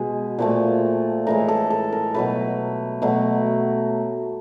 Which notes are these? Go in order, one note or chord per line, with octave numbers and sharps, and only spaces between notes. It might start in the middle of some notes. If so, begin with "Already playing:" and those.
Already playing: B2 G#3 G#4
A#2 F3 A3
A2 E3 G#3 A#4
A4
A4
A#4
B2 F#3 A3 B4
B2 F#3 A3